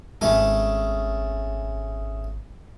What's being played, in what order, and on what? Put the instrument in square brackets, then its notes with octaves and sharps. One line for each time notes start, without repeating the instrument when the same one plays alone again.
[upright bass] G#1 D#4 [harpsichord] C#3 A3 A4